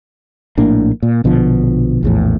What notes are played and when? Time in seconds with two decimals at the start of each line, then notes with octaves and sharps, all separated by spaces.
0.58 A#1 A2 A#3 D4
1.02 A#2
1.24 A#1 B2 D3 F3
2.03 A#1 E2 A2